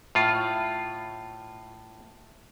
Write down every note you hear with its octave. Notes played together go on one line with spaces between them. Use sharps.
A2 F4